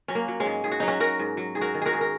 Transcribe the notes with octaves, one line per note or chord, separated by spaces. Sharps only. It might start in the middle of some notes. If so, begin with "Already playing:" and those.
F#3 C#4
A#3
F#3
G#3 C#4
G#2
G#2 G#4
F#4
F#3 D#4
C#4 F#4
F#3 F#4 A#4
G#2
F#3
G#2 G#4
F#4 A#4
D#3
F#4 G#4 A#4
G#2
A#4